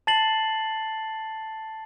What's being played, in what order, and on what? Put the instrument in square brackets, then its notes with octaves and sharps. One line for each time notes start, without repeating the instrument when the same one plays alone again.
[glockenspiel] A5 A6 C7 F#7